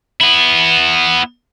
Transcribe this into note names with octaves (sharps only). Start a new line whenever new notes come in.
B3 E4